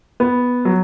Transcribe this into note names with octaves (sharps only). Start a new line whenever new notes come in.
B3
F#3